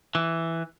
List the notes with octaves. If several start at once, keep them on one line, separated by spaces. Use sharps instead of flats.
E3